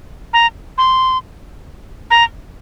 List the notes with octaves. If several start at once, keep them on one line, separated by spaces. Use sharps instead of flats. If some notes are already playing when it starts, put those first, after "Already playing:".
A#5
C6
A#5